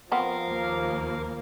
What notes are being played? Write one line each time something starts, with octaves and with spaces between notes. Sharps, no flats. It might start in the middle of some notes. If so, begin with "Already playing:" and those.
F3 B3 C4 A#4 F5
D#2 A#3